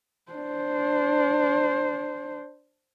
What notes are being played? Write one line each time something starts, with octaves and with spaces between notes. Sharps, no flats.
D4 C5